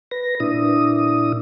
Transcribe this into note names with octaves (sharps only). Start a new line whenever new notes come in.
B4 A#6
A#2 D4 E4 D#6